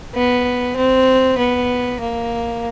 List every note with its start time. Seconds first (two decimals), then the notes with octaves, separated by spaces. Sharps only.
0.15 B3
0.76 C4
1.38 B3
2.00 A#3